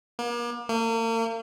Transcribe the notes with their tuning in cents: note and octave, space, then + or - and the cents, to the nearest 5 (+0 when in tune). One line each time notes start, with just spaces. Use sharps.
A#3 +40
A#3 -40